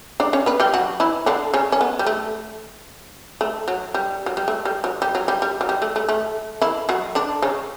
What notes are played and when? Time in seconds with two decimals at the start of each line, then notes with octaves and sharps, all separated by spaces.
0.20 D4 D5
0.33 C#4 C#5
0.46 B3 B4
0.60 G3 G4
0.74 F#3 F#4
1.00 E3 E4
1.26 D3 D4
1.54 C#3 C#4
1.72 C#4
1.81 B3
1.99 G3
2.07 A3
3.41 A3
3.68 F#3
3.94 G3
4.26 F#3
4.37 G3
4.48 A3
4.65 G3
4.84 F#3
5.02 G3
5.15 F#3
5.28 G3
5.42 G3
5.61 F#3
5.69 G3
5.82 A3
5.96 A3
6.09 A3
6.62 E3 E4
6.89 F#3 F#4
7.15 D3 D4
7.42 C#3 C#4